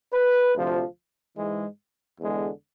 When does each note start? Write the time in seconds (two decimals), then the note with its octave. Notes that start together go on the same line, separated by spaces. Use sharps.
0.14 B4
0.55 D2 C3 F3
1.37 G#2 E3 G#3
2.20 E2 D3 G#3